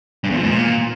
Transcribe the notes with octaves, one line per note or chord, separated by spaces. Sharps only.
G2
E2
F3
G#2
A#2